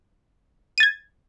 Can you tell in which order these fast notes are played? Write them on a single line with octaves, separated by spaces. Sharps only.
D#7 A6 G#6